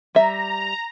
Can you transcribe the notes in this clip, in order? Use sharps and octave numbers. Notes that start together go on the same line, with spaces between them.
G3 E5 A#5